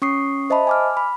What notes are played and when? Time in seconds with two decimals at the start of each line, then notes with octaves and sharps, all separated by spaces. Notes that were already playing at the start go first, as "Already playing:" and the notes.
0.02 C#4 C#6 D#6 C7
0.50 C5 D#5 E5 A5 B5
0.67 G#5 D6 F6
0.97 B5